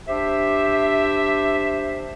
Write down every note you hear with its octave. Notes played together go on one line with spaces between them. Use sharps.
D4 G4 C5 E5